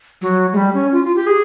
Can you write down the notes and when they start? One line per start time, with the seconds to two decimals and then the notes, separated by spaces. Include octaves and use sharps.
0.22 F#3
0.53 G#3
0.57 G3
0.74 C#4
0.92 F4
1.04 F4
1.16 G4
1.27 G#4